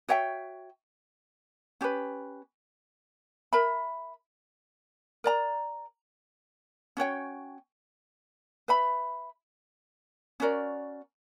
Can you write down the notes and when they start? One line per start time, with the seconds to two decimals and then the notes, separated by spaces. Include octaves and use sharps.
0.09 F#4 C#5 E5 G5
1.81 C#4 G4 B4
3.53 A#4 E5 B5
5.24 A#4 D5 A#5
6.97 C#4 F#4 C#5 G5
8.68 B4 E5 B5
10.40 C#4 F#4 A#4 D5